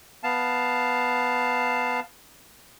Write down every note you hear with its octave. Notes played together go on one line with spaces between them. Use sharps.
B3 F5 A5